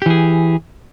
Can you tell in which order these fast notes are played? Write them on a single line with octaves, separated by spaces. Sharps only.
G4 E3 G#4